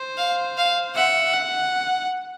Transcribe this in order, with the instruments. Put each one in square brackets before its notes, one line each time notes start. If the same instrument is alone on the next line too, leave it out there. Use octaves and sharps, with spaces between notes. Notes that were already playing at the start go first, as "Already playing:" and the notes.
Already playing: [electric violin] C5
[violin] F5
F5
[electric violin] E5 [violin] F#5
[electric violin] F#5